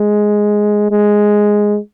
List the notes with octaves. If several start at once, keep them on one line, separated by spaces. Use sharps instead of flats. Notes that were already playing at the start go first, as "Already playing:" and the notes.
Already playing: G#3
G#3